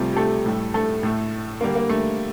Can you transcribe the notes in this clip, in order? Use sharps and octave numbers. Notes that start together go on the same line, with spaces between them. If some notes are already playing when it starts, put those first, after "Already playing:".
Already playing: C3 F3 G3 A3 G4
G4
A3 A4
A2 G3
A3 A4
A2 A3
D3 G3 A#3
A#3
A3